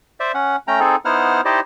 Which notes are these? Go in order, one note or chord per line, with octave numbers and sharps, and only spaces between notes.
C5 D5 E5
C#4 F#5
A3 C#4 G5 A#5
C4 D#4 G#4 A4
B3 D#4 E4 C5 F#5 F6
D#4 E4 G4 C5 D5 D#5